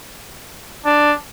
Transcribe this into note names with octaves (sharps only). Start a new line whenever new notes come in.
D4